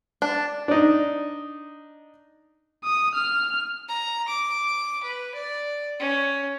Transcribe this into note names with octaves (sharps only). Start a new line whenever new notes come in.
D4
D4 D#4
D#6
F6
A#5
D6
B4
D5
C#4